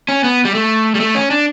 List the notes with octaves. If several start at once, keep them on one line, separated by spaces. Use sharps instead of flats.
C#4
B3
G3
A3
G3
A3
C#4
D4